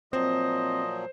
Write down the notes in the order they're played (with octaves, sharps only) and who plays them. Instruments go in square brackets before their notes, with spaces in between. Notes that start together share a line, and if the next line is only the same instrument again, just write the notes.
[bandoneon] A#2 F3 F#3 [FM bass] C4 [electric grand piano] C5 [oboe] D#5